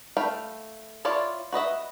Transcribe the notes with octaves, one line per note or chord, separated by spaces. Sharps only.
A3 F5 G5 B5
E4 F4 C#5 D5
F#4 B4 D#5 E5